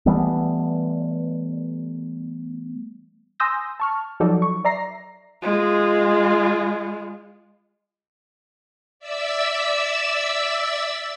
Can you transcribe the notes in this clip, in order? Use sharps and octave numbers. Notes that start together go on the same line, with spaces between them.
E3 G3 A3 B3
G#5 C6 D#6 E6 G6 A#6
A5 C#6 F6
F3 F#3 D#4 A4 D5
C#6
D5 E5 A#5 A#6 C7
G#3 F4
D5 E5 E6